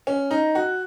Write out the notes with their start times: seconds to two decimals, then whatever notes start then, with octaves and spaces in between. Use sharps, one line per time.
0.07 C#4
0.31 D#4
0.55 F#4